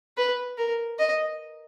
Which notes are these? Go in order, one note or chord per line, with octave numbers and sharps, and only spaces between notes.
B4
A#4
D#5